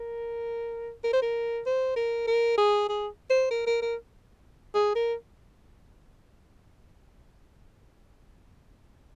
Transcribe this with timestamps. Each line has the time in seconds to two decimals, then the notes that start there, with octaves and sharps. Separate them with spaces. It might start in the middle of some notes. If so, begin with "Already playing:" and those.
Already playing: A#4
1.04 A#4
1.13 C5
1.22 A#4
1.66 C5
1.96 A#4
2.27 A#4
2.58 G#4
2.89 G#4
3.30 C5
3.50 A#4
3.67 A#4
3.82 A#4
4.75 G#4
4.95 A#4